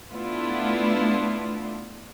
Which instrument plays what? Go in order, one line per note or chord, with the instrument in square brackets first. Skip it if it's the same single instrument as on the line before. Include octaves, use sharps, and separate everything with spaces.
[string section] A3 B3 D4 E4 F4